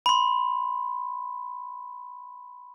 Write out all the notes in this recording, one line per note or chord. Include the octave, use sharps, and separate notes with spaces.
B5 C6